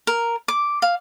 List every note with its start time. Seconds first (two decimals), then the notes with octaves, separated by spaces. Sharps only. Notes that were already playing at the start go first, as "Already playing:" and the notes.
0.07 A#4
0.48 D6
0.82 F5